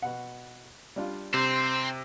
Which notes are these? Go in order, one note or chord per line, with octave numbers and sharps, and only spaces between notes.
B2 F#5
G3 D4 F4
C3 C4 C5